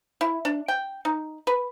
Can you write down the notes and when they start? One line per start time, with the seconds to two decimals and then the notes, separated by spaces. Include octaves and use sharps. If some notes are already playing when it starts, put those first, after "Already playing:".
0.21 E4
0.45 D4
0.68 G5
1.05 D#4
1.47 B4